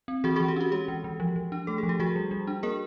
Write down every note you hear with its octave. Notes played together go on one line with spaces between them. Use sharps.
C4
E3 F#4 G#4
F#4 G#4
E3
G4
C#4 F#4
G#3 G4
E3
E3
F3
F3
D4
A3 A4
G#4
F3
G4
F3 F#4 G#4
G3
G3
D4
A#3 G#4 A#4